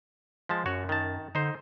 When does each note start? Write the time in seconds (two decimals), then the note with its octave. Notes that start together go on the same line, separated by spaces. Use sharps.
0.49 F3 G#3 A5
0.66 F#2 F#4 C#5
0.89 D#3 A5
1.35 D3 D#4 C5